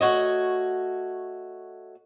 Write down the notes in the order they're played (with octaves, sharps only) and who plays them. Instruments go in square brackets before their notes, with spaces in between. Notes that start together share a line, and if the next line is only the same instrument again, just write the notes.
[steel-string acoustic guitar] A3 F#4 C#5 D#5